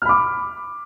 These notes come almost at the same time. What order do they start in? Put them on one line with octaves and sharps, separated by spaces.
F6 B5 D6